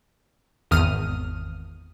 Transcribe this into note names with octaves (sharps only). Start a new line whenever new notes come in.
G#1 E2 D#6 F6 D#7